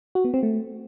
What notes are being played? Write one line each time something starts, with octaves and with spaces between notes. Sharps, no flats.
F#4
B3
C4
A3